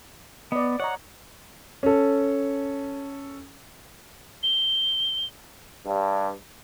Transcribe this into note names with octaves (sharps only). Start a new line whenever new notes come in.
B3 D5 D#5
C#5 D#5 F#5 A#5
C#4 A4
G7
G2